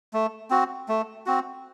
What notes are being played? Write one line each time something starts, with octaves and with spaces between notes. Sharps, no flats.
A3
C4 F#4
A3
C4 F#4